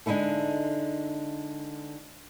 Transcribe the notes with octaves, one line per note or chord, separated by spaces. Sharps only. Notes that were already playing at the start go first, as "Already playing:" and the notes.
D3 G#3 D#4 E4 A4